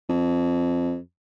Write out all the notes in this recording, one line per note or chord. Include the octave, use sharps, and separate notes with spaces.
F2